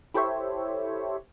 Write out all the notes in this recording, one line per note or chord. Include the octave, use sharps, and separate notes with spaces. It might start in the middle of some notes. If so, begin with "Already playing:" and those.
E4 G4 A4 C5 C#5 E5